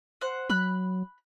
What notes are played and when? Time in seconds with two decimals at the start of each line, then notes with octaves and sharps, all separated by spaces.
0.21 C5 F#5
0.50 F#3 B5 F#6